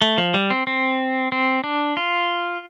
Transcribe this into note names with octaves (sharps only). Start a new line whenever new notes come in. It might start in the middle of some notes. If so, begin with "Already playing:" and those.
A3
F3
G3
C4
C4
C4
D4
F4